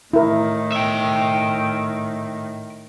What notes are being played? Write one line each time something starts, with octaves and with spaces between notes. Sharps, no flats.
A2 D#3 E4 A#4
E5 G5